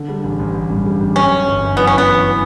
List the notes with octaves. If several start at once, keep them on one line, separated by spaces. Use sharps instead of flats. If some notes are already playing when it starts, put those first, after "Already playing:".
Already playing: D3
G3
A1
A1
A1
G2
G3
A1
F#2 C#4
F#2
G1
F#2
E3 B3
C#4
E3
B3
E3